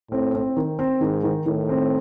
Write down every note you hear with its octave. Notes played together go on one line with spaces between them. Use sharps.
A2 C4
C4
D#3
C4
G#2 D#3
D#3
A2 D#3
C4